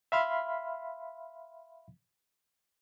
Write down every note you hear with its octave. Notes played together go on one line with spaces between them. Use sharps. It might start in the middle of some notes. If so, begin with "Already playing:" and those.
E5 F5 B5 C6 F6